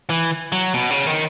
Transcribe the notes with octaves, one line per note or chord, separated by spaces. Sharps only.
E3
F#3
B2
C#3
D#3